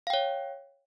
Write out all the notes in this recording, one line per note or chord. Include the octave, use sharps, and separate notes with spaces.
C#5 F5 G5